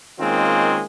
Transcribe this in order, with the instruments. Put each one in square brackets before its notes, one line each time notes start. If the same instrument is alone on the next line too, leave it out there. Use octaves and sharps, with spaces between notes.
[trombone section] D#3 G#3 A#3 C4 C#4 F4